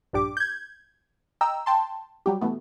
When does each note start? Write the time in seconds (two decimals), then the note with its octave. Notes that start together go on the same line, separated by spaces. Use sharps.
0.13 A#1 G2 D4 G4 D6
0.37 G6 G#6
1.41 D#5 G5 A#5 E6
1.66 G5 A5 C6
2.26 F#3 G3 G4
2.41 B2 E3 A3 B3